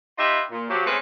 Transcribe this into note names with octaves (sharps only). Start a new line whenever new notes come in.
D#4 F4 G4 B4 D#5 E5
A#2
F3 F#3 G4
G#3 A3 C4 C#4 G#4 B4